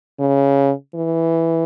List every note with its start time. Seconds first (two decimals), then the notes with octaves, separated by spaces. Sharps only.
0.20 C#3
0.95 E3